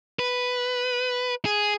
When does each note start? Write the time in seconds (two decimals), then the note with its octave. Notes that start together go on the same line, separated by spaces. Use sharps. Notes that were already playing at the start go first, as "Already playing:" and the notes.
0.19 B4
1.45 G#4